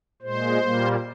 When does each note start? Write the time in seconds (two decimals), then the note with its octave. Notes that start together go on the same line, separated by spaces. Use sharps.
0.22 A#2 G#3 C5
0.59 A#2 G3 A#3